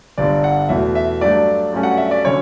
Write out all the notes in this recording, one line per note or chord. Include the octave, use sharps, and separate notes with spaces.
G1 G2 D3 D5
F#5
E2 B2 A3 E5
E5
G2 F#3 A3 D4 D5
G2 F#3 A3 C#4
F#5
E5
D5
D3 F#3 C#4 C#5